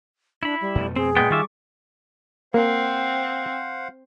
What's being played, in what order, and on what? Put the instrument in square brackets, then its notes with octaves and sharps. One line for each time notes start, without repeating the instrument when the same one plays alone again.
[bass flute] D4 [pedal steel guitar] E4 B5
[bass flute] G3
[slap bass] F2 B2 A3
[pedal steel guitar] C4 [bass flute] G#4
[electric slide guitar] A#2 G#3 B3 [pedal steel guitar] G5
[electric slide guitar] D#3 F4 E5 [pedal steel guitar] G3 C#6 D6
[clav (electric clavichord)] A#3 [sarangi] C4 [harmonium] C5 F5 F#5